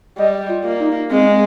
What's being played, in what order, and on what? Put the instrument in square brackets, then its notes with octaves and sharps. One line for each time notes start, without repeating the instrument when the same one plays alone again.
[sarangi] G3 [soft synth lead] D#5
[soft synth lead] F4
[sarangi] A#3
[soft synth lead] D#4
[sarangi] G#3 [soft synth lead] C4